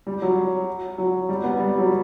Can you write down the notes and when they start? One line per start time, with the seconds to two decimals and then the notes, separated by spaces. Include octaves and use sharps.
0.07 G3
0.22 F#3
0.98 F#3
1.29 G3
1.44 B3
1.59 G3
1.78 F#3